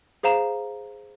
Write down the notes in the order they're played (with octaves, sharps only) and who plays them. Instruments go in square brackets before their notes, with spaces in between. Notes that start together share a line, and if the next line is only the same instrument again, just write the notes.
[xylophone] G#4 C5 F5 A#5 E7